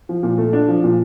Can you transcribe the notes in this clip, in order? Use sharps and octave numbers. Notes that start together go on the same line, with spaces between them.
F3
A#2
A3
D4
F3
A#2